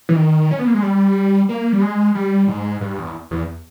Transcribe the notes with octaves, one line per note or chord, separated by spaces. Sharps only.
E3
D#3
C#4
B3
A#3
G#3
G3
A#3
G3
G#3
G3
G#2
G2
E2
E2